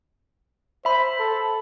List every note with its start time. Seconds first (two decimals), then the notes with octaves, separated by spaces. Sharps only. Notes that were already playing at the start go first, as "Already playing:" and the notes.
0.85 C5 E5 B5
1.19 A4